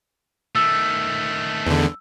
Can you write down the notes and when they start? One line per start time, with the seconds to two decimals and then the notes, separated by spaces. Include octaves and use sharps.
0.55 D#3 A3 E6
1.66 E2 D3